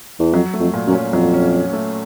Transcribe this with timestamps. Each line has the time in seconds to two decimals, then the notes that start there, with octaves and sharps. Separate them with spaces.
0.19 E2
0.33 F2 F#3
0.54 A3
0.60 F2
0.74 A#2
0.87 F#2
0.93 C#4
1.13 F2 F#3
1.34 C#4
1.54 C#4
1.73 A3